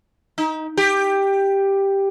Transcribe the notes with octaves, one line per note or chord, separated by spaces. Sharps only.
D#4
G4